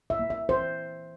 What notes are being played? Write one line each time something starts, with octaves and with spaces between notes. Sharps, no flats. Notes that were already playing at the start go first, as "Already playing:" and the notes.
E5
A#3
E5
E3 C5